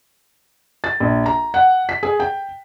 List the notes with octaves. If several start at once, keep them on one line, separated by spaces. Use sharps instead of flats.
A6
A#1
A#5
F#5
B6
G#4
G5